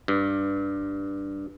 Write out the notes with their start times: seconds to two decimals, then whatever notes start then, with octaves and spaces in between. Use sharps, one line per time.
0.08 G2